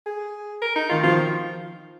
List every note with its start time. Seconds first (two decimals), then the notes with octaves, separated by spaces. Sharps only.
0.06 G#4
0.62 A#4
0.76 D#4
0.89 D#3 F4
1.03 F3 F4